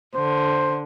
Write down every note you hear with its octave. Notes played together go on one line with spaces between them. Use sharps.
D3 C5